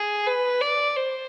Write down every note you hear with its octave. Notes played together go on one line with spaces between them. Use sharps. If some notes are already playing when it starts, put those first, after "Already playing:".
Already playing: G#4
B4
D5
C5